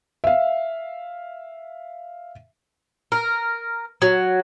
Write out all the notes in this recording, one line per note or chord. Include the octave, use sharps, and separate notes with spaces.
E5 F5
A#4
F#3